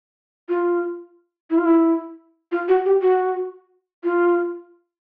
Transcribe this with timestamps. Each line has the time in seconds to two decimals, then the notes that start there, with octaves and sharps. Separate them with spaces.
0.49 F4
1.50 E4
1.58 F4
1.65 E4
2.52 F4
2.68 F#4
2.85 G4
3.02 F#4
4.04 F4